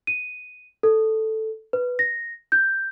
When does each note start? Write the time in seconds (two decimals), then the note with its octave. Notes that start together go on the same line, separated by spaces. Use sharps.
0.07 D#7
0.83 A4
1.73 B4
1.99 A#6
2.52 G6